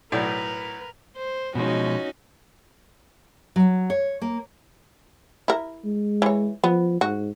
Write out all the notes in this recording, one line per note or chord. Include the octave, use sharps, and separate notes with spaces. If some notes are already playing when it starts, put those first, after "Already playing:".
B1 A2 A#4 B4 D5
C5
B2 F3 G#3 C#4 D#4 F#4
F#3
C#5
A#3
E4 A#4
G#3
E3 C#5
F3 B3
G#2 F#4